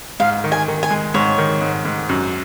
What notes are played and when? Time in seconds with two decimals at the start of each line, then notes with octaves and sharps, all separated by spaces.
0.20 G#2 F5
0.44 D#3
0.52 G#5
0.68 D#3
0.83 G#5
0.91 G#3
1.14 G#2 C#5
1.38 D#3
1.61 G#2
1.85 G#2
2.09 F#2